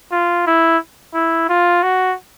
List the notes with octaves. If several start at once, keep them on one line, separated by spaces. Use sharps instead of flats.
F4
E4
E4
F4
F#4